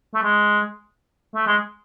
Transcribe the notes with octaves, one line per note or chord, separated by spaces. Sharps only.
A3
G#3
A3
G#3